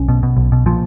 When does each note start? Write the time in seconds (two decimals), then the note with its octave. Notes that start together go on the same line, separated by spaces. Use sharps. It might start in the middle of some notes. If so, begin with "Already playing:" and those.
Already playing: B1 C#4
0.08 B2
0.23 B2
0.37 B1
0.52 B2
0.66 A#2 F3